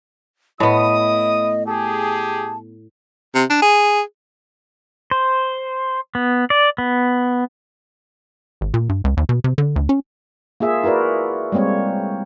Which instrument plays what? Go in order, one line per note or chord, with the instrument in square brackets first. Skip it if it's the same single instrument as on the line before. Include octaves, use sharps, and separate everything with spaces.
[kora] A2 B3 [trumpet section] E4 D#6 [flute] D#5
[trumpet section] G4 G#4 [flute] A5
[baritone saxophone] C3
D4
G#4
[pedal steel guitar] C5
B3
D5
B3
[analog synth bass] G#1
A#2
G2
C#2
D#2
B2
C3
D3
D2
C#4
[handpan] A#3 F4 G#4 E5
E4 F#4 A#4 B4 D5
G3 G#3 A#3 C4 C#5